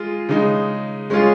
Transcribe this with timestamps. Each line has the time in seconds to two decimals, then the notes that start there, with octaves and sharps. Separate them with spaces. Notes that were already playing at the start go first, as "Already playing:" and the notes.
Already playing: G#3 F4 G#4
0.29 C#3 G#3 D#4
1.10 G#3 C#4 F4 G#4